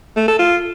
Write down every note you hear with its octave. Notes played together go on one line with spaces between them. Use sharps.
A3
A4
F4